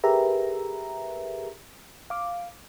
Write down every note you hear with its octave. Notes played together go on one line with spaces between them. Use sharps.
G4 G#4 A#4 B4 E5 A#5
F5 D6